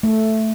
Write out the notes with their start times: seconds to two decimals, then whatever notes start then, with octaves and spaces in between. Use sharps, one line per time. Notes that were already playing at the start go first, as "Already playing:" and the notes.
0.03 A3